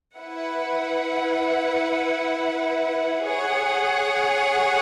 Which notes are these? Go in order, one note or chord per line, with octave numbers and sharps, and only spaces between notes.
E4 B4 F#5
G#4 C#5 F#5